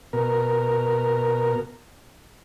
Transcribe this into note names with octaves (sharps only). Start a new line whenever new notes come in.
B2 A#4